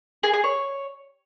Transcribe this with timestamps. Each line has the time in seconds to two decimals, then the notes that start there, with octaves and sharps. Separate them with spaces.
0.23 G#4
0.34 G#4
0.44 C#5